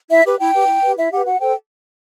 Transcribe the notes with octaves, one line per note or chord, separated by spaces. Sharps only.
E4 E5
G4 B4
E4 G5
G4 B4
E4
G4 B4
E4 E5
G4 B4 F#5
F#4 F#5
A4 C5 G5